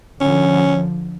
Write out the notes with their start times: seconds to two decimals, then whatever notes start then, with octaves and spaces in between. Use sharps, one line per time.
0.21 D3 F3 C#4